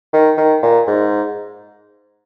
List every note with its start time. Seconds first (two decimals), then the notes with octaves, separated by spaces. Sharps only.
0.13 D#3
0.37 D#3
0.63 A#2
0.87 G#2